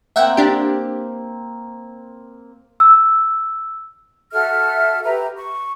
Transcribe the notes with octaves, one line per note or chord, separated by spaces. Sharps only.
A#3 C4 E5 F#5 G5
D4 G4
E6
F#4 A4 E5 F6
G4 B4 E5 A#5
C#6